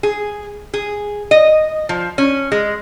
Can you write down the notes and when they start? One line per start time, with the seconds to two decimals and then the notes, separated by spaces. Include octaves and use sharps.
0.03 G#4
0.74 G#4
1.31 D#5
1.89 F3
2.18 C#4
2.52 G#3